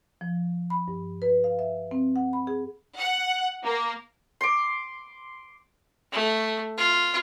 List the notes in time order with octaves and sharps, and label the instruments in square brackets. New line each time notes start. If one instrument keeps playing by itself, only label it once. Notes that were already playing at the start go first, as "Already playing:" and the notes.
[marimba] F3
B5
G2
B4
F5
E5
C4
F#5
B5
G#4
[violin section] F#5
A#3
[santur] C6 D6
[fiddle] A3
F4